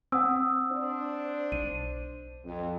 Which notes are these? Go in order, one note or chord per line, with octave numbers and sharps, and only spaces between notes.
C4 F#5 D#6 E6
D4 C5
B1 D#7
F2